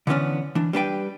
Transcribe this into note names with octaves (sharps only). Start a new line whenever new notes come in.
D3 E3 B3 C#4 D4
E3 D4
G3 D4 B4 G5